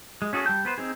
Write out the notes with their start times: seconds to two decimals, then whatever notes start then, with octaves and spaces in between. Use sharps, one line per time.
0.22 G#3
0.33 C#4 F#4 G#4 A4
0.46 G3 G5 A5 G6
0.65 B3 B4 C5
0.78 C4 D#4 G#4